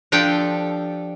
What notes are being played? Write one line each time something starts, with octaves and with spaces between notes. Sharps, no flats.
F3 D4 G4 A4 G5